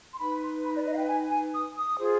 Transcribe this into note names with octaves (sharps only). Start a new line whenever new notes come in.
C6
D#4 B4 B5
C6
B5
D5
D#5
F5
G5
G#5
G#5
D#6
D#6
F4 G#4 C5